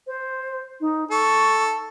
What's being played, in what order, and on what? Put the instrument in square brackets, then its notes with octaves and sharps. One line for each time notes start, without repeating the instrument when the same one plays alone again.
[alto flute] C5
D#4
[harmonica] A4 [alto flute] C#6